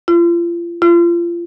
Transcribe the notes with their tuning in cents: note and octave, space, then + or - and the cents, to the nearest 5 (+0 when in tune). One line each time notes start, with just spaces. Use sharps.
F4 -35
F4 -30